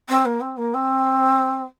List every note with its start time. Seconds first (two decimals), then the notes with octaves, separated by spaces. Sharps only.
0.09 C4
0.25 A#3
0.41 C4
0.57 A#3
0.74 C4